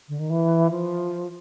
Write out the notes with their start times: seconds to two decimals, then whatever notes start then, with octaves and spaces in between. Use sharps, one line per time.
0.08 D3
0.19 D#3
0.30 E3
0.71 F3